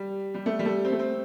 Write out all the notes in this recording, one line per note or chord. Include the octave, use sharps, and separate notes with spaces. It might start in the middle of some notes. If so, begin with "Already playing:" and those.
Already playing: G3
G3
A3
G3
A3
C4
A3
C4